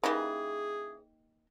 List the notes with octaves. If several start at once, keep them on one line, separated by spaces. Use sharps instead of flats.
C#3 E3 A#3 D#4 G4 G#4